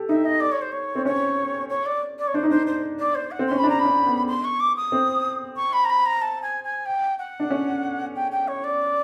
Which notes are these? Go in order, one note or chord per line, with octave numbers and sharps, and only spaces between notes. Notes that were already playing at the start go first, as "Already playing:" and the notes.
Already playing: G4 A4
D#4 E5
D#5
D5
C#5
C5
C#5
C4
C#4 C#5
C#5
D5
D5
C#5
D4 C5
D#4
D4 C5
C5
D5
C5
F#5
C4
C#4 C6
B5
D4
A#5
B5
C#4
B3
C6
C#6
D6
D#6
C4
C#6
B5
A#5
B5
A#5
A5
G#5
G#5
G5
F#5
D4
C#4
G5
G5
C#5
D5